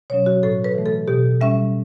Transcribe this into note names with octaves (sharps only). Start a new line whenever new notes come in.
B2 F#3 C#4 C#5
F#4
A2 A4
B4
E3 A3
A4
B2 G4
G3 C#4 E5